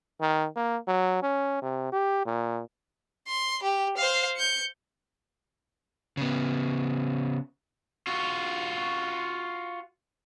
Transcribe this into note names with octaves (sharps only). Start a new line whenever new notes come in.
D#3
A#3
F#3
C#4
C3
G4
A#2
C6
G4
C5 F5
G6 C#7
C#3 B3
F4 F#4